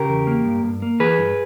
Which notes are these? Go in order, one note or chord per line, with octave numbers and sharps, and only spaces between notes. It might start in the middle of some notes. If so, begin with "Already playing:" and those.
Already playing: C#3 G4 A#4
E2
A#3
G2
G2
A#3
E3 G#4 B4
G2